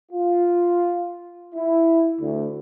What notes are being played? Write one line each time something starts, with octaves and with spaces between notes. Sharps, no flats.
F4
E4
D2